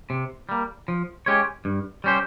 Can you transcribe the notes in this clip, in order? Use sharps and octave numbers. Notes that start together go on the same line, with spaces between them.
C3
G3 A#3
F3
G#3 C#4 G4 C#5
G2
G3 C#4 G4 C5